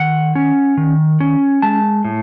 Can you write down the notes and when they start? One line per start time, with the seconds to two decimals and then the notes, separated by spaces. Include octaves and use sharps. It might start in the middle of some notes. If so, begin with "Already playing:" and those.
Already playing: D#3 F#5
0.35 C#4
0.77 D#3
1.20 C#4
1.62 G#3 A5
2.05 A2